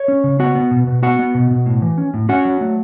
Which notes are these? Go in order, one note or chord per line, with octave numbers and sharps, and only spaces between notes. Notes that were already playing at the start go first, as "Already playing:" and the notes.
Already playing: C#5
C#4
C#3
B3 F#4 F#5
B3
B2
B2
B3 F#4 F#5
B3
B2
B2
A2
E3
C#4
A2
C#4 F#4 F#5
F#3
A3